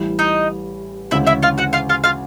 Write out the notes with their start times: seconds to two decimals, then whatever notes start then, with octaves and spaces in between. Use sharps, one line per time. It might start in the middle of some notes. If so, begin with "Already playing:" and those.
Already playing: A1 A2 E3 G3
0.19 D#4 D#5
1.11 D2 C#3 E3 G#3 C#4 E4 E5
1.26 E4 E5
1.42 F4 F5
1.58 F#4 F#5
1.73 F4 F5
1.89 F4 F5
2.04 F4 F5